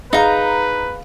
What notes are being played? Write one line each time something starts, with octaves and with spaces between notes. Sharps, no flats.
D#4 G#4 B4 F5 A#5